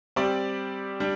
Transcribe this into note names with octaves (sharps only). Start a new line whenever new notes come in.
G3 C4 G4 D5
G3 D4